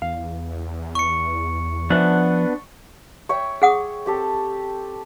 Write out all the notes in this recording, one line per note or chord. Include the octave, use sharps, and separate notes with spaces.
E2 F5
C#6 C#7
F3 B3 D4 E5 F#5
C#5 E5 G5
G#4 F#5 D#6
C4 G4 A4